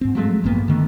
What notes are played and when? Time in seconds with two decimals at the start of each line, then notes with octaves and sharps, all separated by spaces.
0.01 G#2 C4
0.15 F3 F#3 G#3 A3
0.44 A1 G2 A#3 B3
0.68 D3 D#3 A3